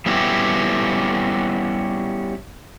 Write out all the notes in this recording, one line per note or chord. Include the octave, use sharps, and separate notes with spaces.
G3 B3 C#4 E4 F#4 G4